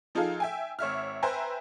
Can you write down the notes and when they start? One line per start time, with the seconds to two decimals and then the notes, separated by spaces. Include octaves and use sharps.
0.15 F3 D#4 F4 G#4 A4 F5
0.40 E5 G5 G#5
0.79 G#1 C#5 E5 F6
1.23 B4 C5 E5 G5 G#5 A#5